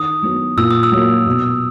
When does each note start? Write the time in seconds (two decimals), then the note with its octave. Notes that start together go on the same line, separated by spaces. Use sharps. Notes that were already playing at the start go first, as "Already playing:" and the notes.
Already playing: D#3 D#6
0.23 F#3 B3
0.57 A#2 E6
0.71 D#6
0.83 E6
0.92 F#3 A#3
1.26 B2